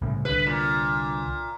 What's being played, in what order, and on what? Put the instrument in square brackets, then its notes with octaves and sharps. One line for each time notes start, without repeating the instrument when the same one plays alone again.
[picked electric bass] C2 A2 C#3
[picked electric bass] C2 D3 [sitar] B4
[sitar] A#2